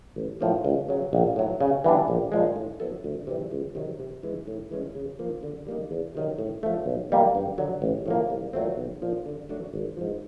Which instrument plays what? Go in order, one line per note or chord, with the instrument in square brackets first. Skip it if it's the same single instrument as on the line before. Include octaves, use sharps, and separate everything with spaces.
[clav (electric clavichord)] A1
A2 F3 A#3
C#2
C#3 F#3
A#1
A2 F#3
C#3
E3 G3 B3 D4
A#1
A#2 F3 G#3
A2
F#3 B3 E4 A4
D2
C3 E3 G3
C#2
C3 D#3 F#3
C3
E3 G#3
A2
E3 G#3 C#4
C#3
F3 A#3
D3
G3 A#3 D#4
E2
C3 D#3 F#3
A2
F3 A3
B1
B2 G3 A#3
G2
D3 F#3
A1
A2 F3 A#3
C2
A#2 F#3 A3 C4
B1
A#2 F3
D3
F#3 A3 D4 F#4
G#1
G#2 F3